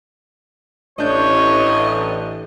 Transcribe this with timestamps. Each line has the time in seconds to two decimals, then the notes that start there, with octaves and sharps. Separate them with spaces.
0.99 A1 A3 D4 C#5 D#5 G6